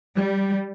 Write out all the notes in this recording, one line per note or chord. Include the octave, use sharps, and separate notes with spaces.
G3